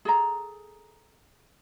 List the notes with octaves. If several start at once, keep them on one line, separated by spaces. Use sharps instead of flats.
G#4 A4 A#5